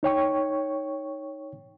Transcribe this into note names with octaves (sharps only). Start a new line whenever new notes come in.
D#4 C#5 G5 C#6